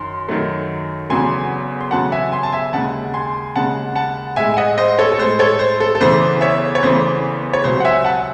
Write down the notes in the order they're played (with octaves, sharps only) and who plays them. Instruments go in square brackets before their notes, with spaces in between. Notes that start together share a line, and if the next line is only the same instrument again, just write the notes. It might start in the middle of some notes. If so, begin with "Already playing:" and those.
Already playing: [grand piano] F#2 D#3 C6
F#2 D#3 F#3 A3
E2 C#3 F#3 A3 G#5 C6
C6
E2 C#3 F#3 A3 F#5 A5
E5 G#5
G#5 C6
A5
E5 G#5
D#2 C#3 G#3 F#5 A5
G#5 C6
D#2 C#3 G#3 F#5 A5
F#5 A5
A2 G#3 E5 G#5
G#5
D#5 F#5
C5 D#5
A4 C#5
A4
A2 G#3 C5
A4 C#5
C5
A4
A4
E2 C#3 E3 A3 C5
C#5 E5
C#5
E2 C#3 E3 A3 C5
C#5
C#2 C3 F#3 C5
F#5
E5 G#5
F#5 A5